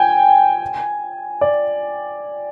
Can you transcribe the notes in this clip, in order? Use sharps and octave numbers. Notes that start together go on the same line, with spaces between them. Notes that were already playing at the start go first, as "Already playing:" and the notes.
Already playing: G5 G#5
D5